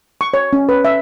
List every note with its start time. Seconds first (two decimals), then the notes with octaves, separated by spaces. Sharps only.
0.21 C#6
0.34 C#5
0.53 C#4
0.69 B4
0.85 E5